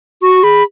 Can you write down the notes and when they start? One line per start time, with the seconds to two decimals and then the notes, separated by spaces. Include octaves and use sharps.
0.22 F#4 C#6
0.43 G#4 B5